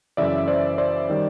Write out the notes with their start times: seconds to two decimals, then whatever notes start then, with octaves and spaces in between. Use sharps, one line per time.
0.17 F#2 C#3 E3 D5 E5
0.48 C5 D5
0.78 C5 D5
1.10 D#3 G3